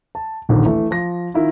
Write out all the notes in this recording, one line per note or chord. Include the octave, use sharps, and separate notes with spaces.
A5
D#1 A#1 D3 D#3
E3 A3
F3 A#6
D#3 E4 F4